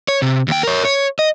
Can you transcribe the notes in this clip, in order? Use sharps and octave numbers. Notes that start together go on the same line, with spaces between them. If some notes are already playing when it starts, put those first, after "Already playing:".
C#5
C3
D#2 G5
A#4 C#5
C#5
D#5